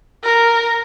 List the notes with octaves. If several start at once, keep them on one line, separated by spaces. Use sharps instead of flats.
A#4